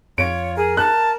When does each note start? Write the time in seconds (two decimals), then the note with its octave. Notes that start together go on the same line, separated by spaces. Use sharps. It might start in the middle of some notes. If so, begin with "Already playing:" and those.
0.18 F2 F4 C#5 D7
0.56 G#4 A#4
0.77 A5 F#6